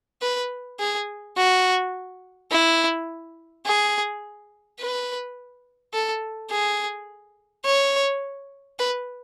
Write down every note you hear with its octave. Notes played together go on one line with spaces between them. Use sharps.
B4
G#4
F#4
E4
G#4
B4
A4
G#4
C#5
B4